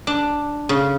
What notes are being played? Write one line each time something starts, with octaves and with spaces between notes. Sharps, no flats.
D4
C#3